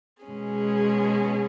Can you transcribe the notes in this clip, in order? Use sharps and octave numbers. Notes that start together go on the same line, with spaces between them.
B2 G#3 C#4 G#4